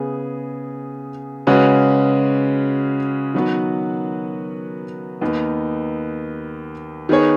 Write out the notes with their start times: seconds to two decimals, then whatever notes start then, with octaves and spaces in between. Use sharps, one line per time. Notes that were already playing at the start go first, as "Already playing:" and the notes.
Already playing: C#3 B3 G#4
1.47 C#3 G#3 C#4 F#4 B4
3.34 D#3 F#3 B3 F#4 B4
5.21 D#2 D#3 B3 D#4
7.09 D#3 B3 G#4 C#5